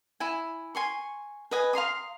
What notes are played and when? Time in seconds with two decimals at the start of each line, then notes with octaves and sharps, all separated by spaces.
0.20 E4 G#5
0.75 G#5 C6 C#6
1.51 B4 D#5 G#5
1.73 F5 A#5 C6 D#6